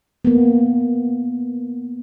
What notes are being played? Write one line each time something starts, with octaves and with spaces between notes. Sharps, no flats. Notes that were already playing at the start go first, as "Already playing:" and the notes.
A#3 B3